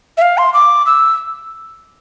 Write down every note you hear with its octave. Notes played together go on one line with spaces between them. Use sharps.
E5
F5
C6
D6
E6